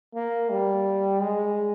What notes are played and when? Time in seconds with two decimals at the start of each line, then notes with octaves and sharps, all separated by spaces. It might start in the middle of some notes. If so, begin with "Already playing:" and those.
0.15 A#3
0.50 G3
1.20 G#3